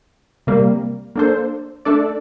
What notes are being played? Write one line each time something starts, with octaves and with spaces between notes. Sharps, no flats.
C3 G3 A#3
A#3 D4 A4 C5
A3 D4 A4 D5